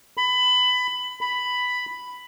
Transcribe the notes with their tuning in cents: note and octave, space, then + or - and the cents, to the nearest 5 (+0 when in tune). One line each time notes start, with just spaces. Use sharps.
B5 +20
B5 +5